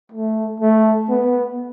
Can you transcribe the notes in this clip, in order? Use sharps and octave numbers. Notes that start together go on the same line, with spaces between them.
A3
A3
B3